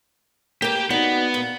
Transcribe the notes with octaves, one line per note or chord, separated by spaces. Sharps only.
A#3 G4 B4 G5
B3 D#4 F#4 D5
A#2